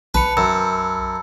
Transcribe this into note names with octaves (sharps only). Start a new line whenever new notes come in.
B1 B4 A5 B5 C#7
F#2 A#5 E6